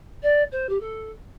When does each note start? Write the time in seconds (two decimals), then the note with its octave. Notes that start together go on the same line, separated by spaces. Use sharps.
0.22 D5
0.52 C5
0.69 G4
0.80 A4